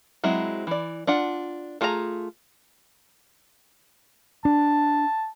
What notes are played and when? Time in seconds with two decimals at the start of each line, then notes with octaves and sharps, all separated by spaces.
0.24 F#3 G#3 C4 E4
0.67 E3 D5
1.07 D4 F4 F#5
1.81 A3 F4 G#4 C5 A#5
4.45 D4 A5